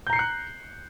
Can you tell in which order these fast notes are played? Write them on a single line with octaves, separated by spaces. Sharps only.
G6 A#5 C7 C#7 F#6